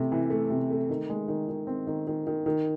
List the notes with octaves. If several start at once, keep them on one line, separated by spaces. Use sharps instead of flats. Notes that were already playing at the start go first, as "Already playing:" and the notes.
Already playing: C3 E3 A3
E3
A3
C3
A3
D#3
G#3
D#3
D#3
C4
D#3
D#3
D#3
D#3